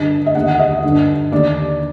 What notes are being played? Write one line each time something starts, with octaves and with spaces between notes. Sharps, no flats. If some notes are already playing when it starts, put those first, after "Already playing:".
Already playing: G2 D3 D#5
D#5
D#2 D3 F#5
F#5
D#5
D3
G2
D#2 D3 D5